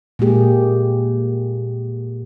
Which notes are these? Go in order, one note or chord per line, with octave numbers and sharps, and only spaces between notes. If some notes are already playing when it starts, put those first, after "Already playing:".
A#2 G#3 A#3 G4 G#4